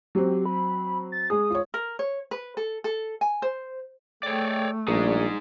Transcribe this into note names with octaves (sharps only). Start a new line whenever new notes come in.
F#3 C4 G4
B5
A6
G#3 G#4 D#6
F4 C#5
A#4
C#5
B4
A4
A4
G#5
C5
A3 G#4 A4 C#5 D5 G5
A#1 G3 D#4 G#4 D5